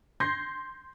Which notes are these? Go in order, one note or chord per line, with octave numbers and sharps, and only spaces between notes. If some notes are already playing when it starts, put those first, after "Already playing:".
C6 G6 G#6 A#6 C7